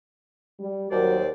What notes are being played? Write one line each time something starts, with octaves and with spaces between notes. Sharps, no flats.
G3
D#2 F#3 F#4 A#4 C5 D5